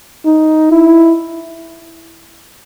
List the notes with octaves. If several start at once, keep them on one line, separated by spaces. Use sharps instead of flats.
D#4
E4